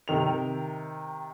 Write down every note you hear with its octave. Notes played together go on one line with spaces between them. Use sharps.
C3 D#3 F7